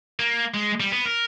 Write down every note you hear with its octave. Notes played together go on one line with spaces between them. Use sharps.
A#3
G#3
G3
B3
A#4